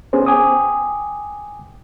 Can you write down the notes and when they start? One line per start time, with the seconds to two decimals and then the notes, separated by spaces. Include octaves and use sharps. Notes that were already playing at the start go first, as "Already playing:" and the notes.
0.13 B3 C#4 G#4 C5
0.26 G5 G#5 D6 D#6